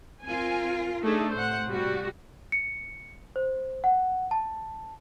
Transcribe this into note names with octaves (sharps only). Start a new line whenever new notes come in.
C4 F4 A#4 G#5
A3 D4 D#4 G#4
A2 C3 C5 F#5
G3 F#4
C#7
C5
F#5
A5